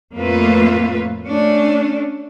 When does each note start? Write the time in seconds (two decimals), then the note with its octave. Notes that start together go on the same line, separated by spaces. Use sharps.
0.15 F2 A2 A3 A#3 F4 B4
1.29 A3 C#4 D4